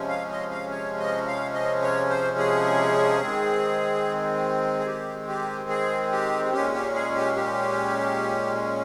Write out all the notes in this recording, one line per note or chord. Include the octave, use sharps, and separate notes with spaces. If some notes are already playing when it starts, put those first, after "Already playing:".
Already playing: C3 F3 G#3 C#4
F5
D#5
F5
C#5
D#5
F5
D#5
C#5
C5
G#4
D#3 G#3 C4
G#4
G4
G4
G#4
G4
A#2 G#3 C#4 G4
G4
G#4
G4
G4